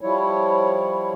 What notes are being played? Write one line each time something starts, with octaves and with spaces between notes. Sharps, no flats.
F3 G3 E4 C#5